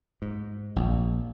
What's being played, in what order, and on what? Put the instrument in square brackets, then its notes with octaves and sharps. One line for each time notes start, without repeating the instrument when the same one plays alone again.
[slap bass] G#2
A#1